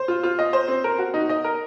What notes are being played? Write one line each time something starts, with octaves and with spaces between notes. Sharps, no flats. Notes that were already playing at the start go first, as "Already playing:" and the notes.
Already playing: C5
F4
F4
D#5
C5
C4
A#4
F#4
D#4
D#5
A#4